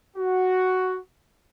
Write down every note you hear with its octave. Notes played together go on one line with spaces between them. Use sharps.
F#4